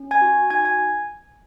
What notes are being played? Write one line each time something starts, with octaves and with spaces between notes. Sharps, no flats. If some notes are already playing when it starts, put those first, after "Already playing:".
Already playing: C#4
G#5 G#6
F#4
D#4 G#5 G#6
G#5 G#6